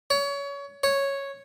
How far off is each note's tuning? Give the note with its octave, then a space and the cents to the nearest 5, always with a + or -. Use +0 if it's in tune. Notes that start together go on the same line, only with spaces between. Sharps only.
C#5 +25
C#5 -5